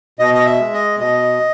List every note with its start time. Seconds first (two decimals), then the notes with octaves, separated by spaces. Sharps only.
0.19 B2 D#5
0.34 D#5
0.46 E5
0.60 G#3
0.73 D#5
0.99 B2 D#5